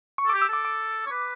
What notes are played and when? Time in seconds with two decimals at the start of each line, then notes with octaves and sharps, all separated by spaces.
0.18 C#6
0.26 A4
0.29 G4 D6
0.42 E6
0.49 A4 D6
0.65 D6
1.06 C#5
1.12 B4